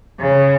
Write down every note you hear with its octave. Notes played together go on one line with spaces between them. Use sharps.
C#3